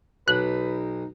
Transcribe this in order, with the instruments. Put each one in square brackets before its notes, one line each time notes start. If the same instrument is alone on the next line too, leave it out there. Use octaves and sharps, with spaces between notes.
[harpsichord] B1 [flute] D#4 [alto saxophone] B4 [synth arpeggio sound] F#6